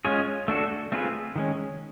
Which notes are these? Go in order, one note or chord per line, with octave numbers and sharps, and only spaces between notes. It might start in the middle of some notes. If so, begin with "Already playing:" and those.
G#3 C#4 F4 G#4 C#5
A3 D4 F#4 A4
A3 C4 F4 G#4 B4
D#3 G#3 C#4